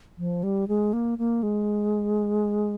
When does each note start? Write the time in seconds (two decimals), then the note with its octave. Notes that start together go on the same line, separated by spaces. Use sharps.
0.18 F3
0.43 G3
0.68 G#3
0.93 A#3
1.18 A#3
1.43 G#3